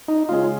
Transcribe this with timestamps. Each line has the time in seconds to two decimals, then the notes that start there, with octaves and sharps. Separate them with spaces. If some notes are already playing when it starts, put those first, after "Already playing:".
0.08 D#4
0.29 C#3 G#3 C#4 F4 G#4